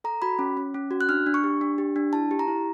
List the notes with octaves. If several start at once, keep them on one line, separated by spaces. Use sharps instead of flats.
A4 A#5
F#4 B5
C#4
C#4
C#4
F#4
F#6
D4 F6
D4
C#6
G4
D4
G4
D4
E4 A5
G4
A#5
E4